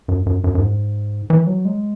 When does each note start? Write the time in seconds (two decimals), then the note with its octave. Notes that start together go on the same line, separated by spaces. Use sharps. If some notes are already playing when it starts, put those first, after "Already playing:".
0.08 F#2
0.26 F#2
0.44 F#2
0.55 F#2
0.60 G#2
1.30 E3
1.47 F#3
1.65 G#3